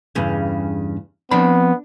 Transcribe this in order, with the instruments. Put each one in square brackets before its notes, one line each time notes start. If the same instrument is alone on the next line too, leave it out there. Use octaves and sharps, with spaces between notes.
[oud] E2 G2 C#3
[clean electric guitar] F3 C4 B5 [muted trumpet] B3 [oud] D4